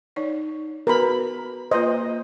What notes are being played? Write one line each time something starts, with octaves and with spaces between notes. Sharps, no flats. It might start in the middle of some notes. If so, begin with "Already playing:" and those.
D#4 C#5 D5
B3 F#4 A#4 B4 B5
A#3 F4 B4 C5 D#5